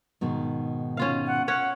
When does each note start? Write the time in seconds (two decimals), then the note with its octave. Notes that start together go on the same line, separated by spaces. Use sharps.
0.21 G#2 B2 D#3
0.97 C#4 F4 F5
1.27 F#5
1.48 C#4 C#5 F#5